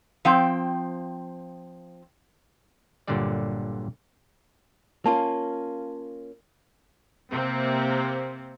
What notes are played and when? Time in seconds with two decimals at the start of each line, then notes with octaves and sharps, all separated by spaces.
0.25 F3 C4 G5
3.07 G1 A#2 D3 F#3 G3 D5
5.06 A#3 C#4 F4 A5
7.31 C3 A#3 C4